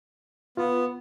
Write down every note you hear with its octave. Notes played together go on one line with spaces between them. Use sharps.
B3 F4